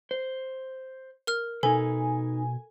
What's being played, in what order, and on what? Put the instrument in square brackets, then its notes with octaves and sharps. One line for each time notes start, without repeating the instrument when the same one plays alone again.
[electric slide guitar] C5
[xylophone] A#4 F6
[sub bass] B2 [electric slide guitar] D#4 B4 [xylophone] A4 [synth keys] G#5